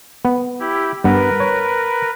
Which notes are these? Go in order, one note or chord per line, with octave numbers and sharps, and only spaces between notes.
B3
E4 G4
G2 B3 A#4 B4
C#5